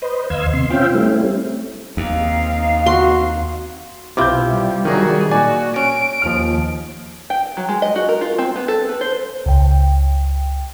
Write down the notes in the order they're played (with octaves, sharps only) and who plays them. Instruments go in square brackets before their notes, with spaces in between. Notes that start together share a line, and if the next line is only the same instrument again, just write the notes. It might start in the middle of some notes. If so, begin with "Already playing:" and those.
[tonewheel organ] B4 C5 D#5
D#2 D#5 F5 C6 E6 G#6
C3 C6
C4 C#4 F4 E5 F5 G5
G3 A3 C4 C#4 E4
[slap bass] D#2 [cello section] C4 D#4 F5
[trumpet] F#4 [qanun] C6
[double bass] B1 [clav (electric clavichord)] C3 E4 F4 [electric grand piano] D6 G6
[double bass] G3
[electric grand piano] D#3 F#3 D#4 [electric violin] F#4 G#4
[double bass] A#2 [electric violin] F#4 [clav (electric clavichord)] D5 [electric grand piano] G#5
[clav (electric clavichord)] C#4 [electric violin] D7
[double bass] D#2 [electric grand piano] F3 F6
[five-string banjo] G5
F#3
G#3
D#5
F#4
A#4
F4
C4
B3
A4
B4
C5
[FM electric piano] C#2 G5